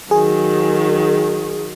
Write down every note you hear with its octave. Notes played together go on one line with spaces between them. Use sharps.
D#3 F#3 G#4